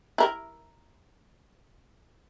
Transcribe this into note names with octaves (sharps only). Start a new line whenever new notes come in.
E4 A#4